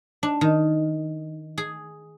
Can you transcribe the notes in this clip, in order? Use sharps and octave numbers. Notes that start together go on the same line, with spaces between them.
D4
D#3
G#4